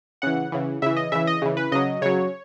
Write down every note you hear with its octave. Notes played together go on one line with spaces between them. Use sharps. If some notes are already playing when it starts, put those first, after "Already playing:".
C#3 E3 F#5
C#3 E3
C#3 E3 E5
D#5
C#3 E3 E5
D#5
C#3 E3
B4
C#3 F#3 D#5
C#3 F#3 C#5